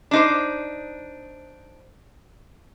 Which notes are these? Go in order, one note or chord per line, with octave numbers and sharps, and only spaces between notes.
D4 D#4 C5